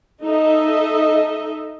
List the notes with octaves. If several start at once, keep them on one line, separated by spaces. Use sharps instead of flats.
D#4 A4 D#5 E5